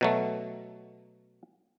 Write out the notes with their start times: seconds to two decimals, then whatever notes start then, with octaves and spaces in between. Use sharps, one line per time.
0.01 B2 F#3 A3